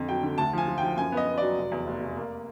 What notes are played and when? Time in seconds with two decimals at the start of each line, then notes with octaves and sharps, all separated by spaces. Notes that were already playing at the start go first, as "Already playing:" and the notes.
Already playing: F2 D3
0.09 F#3 G5
0.23 D3
0.38 D2 A5
0.53 F3 G#5
0.68 F3
0.78 G5
0.83 F3
0.97 F#2 G#5
1.12 B3 D#5
1.27 B3
1.38 F#3 D5
1.57 F1
1.72 E2
1.87 F1
2.02 F1
2.17 A#3